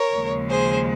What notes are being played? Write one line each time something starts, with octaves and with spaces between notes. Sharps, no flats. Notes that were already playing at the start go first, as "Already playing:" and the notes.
Already playing: A#4 C#5
D#2 C#3 F3 G#3
G#4 C5